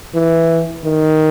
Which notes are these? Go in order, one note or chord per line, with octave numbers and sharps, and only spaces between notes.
E3
D#3